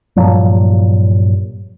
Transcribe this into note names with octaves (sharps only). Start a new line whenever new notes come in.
G2 A#2 F3 F#3